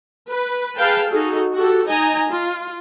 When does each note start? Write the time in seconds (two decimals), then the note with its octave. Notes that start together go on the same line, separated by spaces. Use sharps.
0.30 B4
0.77 G#4 B4 F5 G5 A5
1.10 D#4 F#4 G#4 A4
1.55 F#4 G4 A4
1.87 D#4 D#5 G#5 A#5
2.29 F4